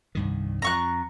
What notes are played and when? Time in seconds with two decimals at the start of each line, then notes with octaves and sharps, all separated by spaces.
0.15 C2 G2 D#3
0.62 F2 F3 A#5 C#6 F#6